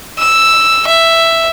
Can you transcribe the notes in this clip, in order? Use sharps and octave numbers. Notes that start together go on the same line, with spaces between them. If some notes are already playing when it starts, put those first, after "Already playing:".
E6
E5